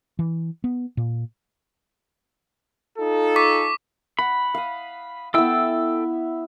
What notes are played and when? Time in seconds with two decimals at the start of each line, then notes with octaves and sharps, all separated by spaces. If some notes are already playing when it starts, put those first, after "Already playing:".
0.19 E3
0.64 B3
0.97 A#2
2.98 D#4 F4 A4
3.36 C#6 D6 B6
4.19 F#5 B5
4.54 F5 D#6
5.34 B3 E4 A4 G5 E6